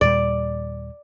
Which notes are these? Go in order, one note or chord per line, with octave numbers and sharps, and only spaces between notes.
D#2 A#2 G3 D5